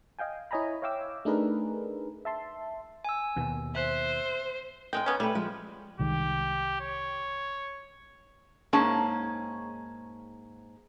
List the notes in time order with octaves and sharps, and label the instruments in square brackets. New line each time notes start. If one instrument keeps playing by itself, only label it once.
[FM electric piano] D#5 F5 G5 G#5
E4 C#5 D#5 G#5 A#5 B5
C#5 E5 F5 G5 D6 E6
A3 D4 D#4 G#4 A#4 B4
E5 A5 C6
[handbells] G#5 E6
[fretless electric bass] D#2 B2
[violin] C5 [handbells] E5 F#6
[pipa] G#3 G5 [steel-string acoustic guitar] A#4 D#5
[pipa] B3 C#4
[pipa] G3 [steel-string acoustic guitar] A3 B4
[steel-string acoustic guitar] F3 G#3
[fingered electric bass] C2 D#3 G#3 [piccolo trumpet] G4
[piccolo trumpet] C#5
[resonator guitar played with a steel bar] G#2 A#3 C#4 G#4 A5